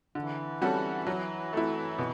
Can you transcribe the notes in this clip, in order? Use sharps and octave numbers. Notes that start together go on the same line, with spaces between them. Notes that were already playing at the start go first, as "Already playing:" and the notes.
D3 E3
G3 C#4 F#4 A4
F#3
A3 E4
B2